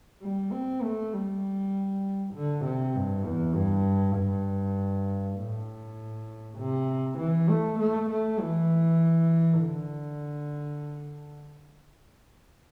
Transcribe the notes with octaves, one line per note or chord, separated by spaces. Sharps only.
G3
C4
A3
G3
D3
C3
G2
E2
G2
G2
A2
C3
E3
A3
A3
A3
E3
D3